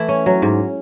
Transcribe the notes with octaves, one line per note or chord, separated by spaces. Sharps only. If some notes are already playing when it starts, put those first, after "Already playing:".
Already playing: E3 A3 E4
C#4
F#3
G#2